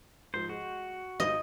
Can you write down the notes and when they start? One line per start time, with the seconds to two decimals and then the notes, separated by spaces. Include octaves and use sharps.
0.34 G#2 F3 C5
0.49 G#3 F#4
1.20 G#1 D#4 D#5